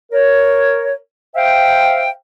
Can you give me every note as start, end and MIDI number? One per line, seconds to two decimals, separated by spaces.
0.12 0.92 70
0.12 0.92 73
1.35 2.10 72
1.35 2.10 76
1.35 2.10 77
1.35 2.10 79